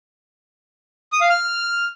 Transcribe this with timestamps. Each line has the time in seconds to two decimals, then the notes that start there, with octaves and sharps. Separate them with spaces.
1.12 D#6
1.21 F5
1.30 F6